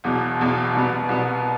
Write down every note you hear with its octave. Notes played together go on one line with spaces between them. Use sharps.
E1 E2 B2
E1 E2 B2
C2 B2 B3
C2 B2 B3